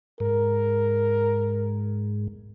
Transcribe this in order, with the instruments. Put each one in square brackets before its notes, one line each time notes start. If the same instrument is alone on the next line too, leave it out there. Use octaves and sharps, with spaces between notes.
[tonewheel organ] G#2 [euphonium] A#4